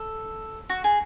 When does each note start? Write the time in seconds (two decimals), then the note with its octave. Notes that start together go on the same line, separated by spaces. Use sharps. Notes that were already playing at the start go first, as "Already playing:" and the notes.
Already playing: A4
0.69 F#4
0.84 G#4